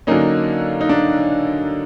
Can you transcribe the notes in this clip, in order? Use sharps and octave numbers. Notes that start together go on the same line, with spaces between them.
D3 F#3 A#3 C#4 D#4
D#4
D4